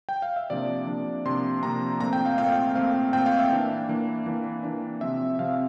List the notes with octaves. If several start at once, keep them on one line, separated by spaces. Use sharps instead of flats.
G5
F5
E5
C3 F3 A#3 D4 D5
C3 F3 A#3 D4
C3 F3 A#3 D4 C6
C3 F3 A#3 D4 A#5
A#2 A3 C4 A#5
G5
F5
A#2 A3 C4 F5
A#2 A3 C4 F5
A#2 A3 C4 G5
F5
E5
E3 A#3 D4
E3 A#3 D4
E3 A#3 D4
E3 A#3 D4
C3 F3 C4 E5
C3 F3 C4 F5